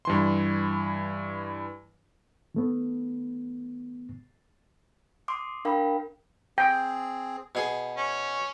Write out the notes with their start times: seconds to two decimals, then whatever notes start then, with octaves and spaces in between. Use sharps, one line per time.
0.05 G2 E3 C6
2.55 D#3 A3 B3
5.28 C6 D6 D#6
5.65 D4 A#4 F5 G5 B5
6.58 C4 G#4 G5
7.55 B2 G#4
7.97 C#4